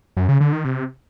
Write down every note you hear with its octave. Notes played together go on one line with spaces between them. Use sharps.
F#2
C#3
D3
D#3
C3